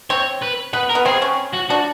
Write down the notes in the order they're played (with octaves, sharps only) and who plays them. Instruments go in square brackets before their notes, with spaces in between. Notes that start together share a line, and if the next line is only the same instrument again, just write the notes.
[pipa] C4 [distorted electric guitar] C#5
[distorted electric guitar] B4
[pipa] B3 [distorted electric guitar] B4
[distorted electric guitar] A#4
[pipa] B3
[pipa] C4 [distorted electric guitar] G#4
[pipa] C#4
[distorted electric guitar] F#4
[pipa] D4 [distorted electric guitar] F#4